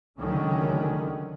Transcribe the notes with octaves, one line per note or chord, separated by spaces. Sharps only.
C#2 D3 D#3 F#3 A3 C#4